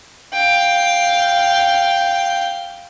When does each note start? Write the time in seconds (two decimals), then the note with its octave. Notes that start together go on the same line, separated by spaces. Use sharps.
0.33 F5 G5